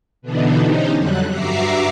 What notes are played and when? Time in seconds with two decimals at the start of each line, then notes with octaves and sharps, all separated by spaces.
0.22 B2 D3 E3 B3 D4 D#4
0.64 C#4 D#4 G4 C5
0.96 F2 D3 F#3 G3 F#6
1.30 G2 F#4 E5 A#5 D6 C7